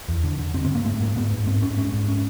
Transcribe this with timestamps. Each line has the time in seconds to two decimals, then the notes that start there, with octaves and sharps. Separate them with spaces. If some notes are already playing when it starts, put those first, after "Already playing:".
0.09 E2
0.24 D3
0.39 D3
0.54 G2 C4
0.64 C4
0.70 G2 A#3
0.85 G#2 A3
1.00 G#2 A#3
1.16 G#2 B3
1.31 G#2
1.47 G#2 C4
1.62 G#2 C#4
1.77 G#2 C#4
1.93 G#2
2.08 C#4